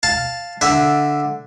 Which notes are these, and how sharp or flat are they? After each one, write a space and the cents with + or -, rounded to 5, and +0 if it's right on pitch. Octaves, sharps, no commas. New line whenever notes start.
F5 +0 A5 +0
D3 +0 E5 +0